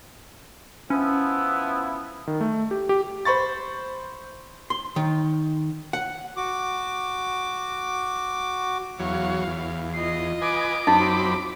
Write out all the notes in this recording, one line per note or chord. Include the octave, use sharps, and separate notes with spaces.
F3 B3 C#4 E4
D#3
A3
G4
G4
C5 B5 C#6 A6
C6
D#3
F#5
F#4 D6
E2 F#3 C#5 F5
E2
F4 D#5 C7
B4 G#5 D6
F#2 C4 D#4 B5